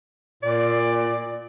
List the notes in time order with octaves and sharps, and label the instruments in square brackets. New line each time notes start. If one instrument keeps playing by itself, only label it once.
[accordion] A#2 [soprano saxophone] D5